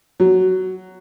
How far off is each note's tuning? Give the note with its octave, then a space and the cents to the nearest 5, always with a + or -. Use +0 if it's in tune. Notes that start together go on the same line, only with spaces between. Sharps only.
F#3 +10